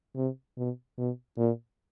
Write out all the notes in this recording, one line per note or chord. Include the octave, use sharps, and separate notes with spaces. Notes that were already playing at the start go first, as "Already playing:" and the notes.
C3
B2
B2
A#2